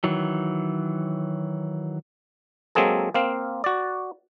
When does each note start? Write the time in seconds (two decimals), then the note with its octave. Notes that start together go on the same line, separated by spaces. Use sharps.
0.04 D#3 E3 F#3
2.75 F#3 G#3 A#3 C4 G#4 A4
3.14 A#3 C4 F5
3.64 F#4 D5